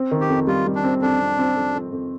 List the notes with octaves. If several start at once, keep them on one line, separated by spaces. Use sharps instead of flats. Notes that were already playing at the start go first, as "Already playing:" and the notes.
Already playing: C4
D#3
G4
F2
G3 F4
G3
D4
C4
F2 D4
C4
C4
F2
F2
F2